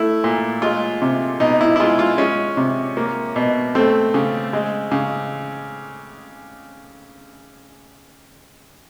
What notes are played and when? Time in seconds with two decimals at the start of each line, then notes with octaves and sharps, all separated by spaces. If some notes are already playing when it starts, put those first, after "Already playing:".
Already playing: A3 E4
0.24 A#2
0.62 G#3 F4
1.02 C3
1.40 B2 D#4
1.61 E4
1.76 E4
1.80 G#3 F4
1.99 F4
2.18 G#3 C#4
2.57 C3
2.97 A#3
3.36 B2
3.75 A3 C4
4.14 C#3
4.53 G#3
4.92 C#3